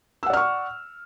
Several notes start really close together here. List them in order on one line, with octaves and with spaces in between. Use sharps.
E6 F#5 D5 F6 C#6